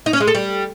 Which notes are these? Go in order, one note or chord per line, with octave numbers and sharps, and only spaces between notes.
D#4
C#4
G#3
A4
G3